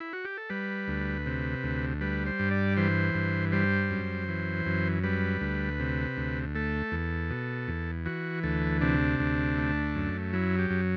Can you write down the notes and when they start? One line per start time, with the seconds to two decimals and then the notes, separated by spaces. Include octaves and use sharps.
0.00 E4
0.13 F#4
0.25 G4
0.37 A4
0.50 G3 B4
0.88 D2
1.26 C3
1.63 D2
2.01 G3 B4
2.26 C5
2.39 G2
2.51 D5
2.77 E3 C5
3.14 G2
3.52 G3 C5
3.90 F#2
4.28 E3
4.66 F#2
5.03 G3 B4
5.41 D2
5.80 C3
6.17 D2
6.55 A3 A4
6.92 E2
7.30 B2
7.68 E2
8.06 E3 F#4
8.43 D2 A4
8.81 C3 D4
9.20 D2
9.57 A3
9.95 F#2
10.33 F#3 E4
10.58 G4
10.70 F#2